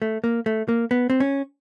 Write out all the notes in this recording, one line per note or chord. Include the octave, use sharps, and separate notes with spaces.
A3
A#3
A3
A#3
B3
C4
C#4